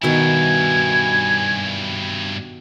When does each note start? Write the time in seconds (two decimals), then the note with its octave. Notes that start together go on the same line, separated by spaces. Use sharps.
0.03 G2 B2 D#3 E4 G#5